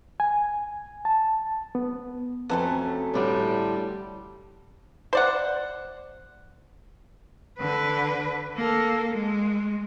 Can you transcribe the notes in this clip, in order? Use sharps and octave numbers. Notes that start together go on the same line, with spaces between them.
G#5
A5
B3
F2 F#3 A3 C#4 B4 A5
A2 D3 G3 D4
C5 D5 F#5
D3 B4
A#3 A4
G#3